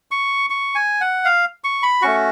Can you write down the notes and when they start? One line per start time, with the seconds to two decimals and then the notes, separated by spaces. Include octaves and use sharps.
0.11 C#6
0.50 C#6
0.75 G#5
1.01 F#5
1.25 F5
1.64 C#6
1.83 B5
2.02 A3 C#4 F#4 C#6